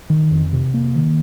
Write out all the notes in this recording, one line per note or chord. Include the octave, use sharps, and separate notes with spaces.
D#3
F2
C3
A#3
D#3